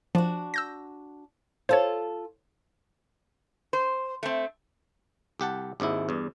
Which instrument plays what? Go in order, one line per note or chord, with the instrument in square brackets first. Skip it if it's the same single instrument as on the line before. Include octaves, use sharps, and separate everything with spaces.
[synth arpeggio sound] F3 [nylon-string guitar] D4 F#4
[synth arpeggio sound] E6 G6 A#6
[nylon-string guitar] F4 A4 [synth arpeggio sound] C5 C#5
[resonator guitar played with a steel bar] C5
A3 C4
[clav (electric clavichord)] C2 G4 F#5 A5
G#1 D#2 G#2 E4
E2 G2